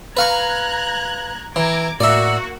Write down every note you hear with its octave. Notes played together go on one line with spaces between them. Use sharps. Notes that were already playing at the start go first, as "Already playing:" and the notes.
B4 F5 A#5 C#6 F#6 G#6
E3 A#5 D6 G#6
A2 A#3 F#4 D5 E5